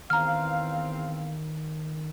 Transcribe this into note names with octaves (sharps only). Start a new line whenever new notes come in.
E2 D#3 C4 F5 A#5 F6